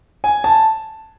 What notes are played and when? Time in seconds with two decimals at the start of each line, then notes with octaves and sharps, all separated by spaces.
0.24 G#5
0.44 A5